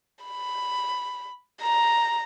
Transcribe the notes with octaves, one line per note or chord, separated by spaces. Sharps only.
B5
A#5